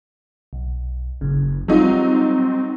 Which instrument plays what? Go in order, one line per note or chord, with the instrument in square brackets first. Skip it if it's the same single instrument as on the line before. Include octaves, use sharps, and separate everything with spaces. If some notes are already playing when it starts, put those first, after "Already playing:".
[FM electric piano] B1
[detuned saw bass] F#1 [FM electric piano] C#3
[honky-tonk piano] F#3 D#4 [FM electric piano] G3 F4 [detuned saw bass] C4